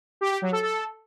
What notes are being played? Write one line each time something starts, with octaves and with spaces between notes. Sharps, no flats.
G4
G4
F#3
A4
A4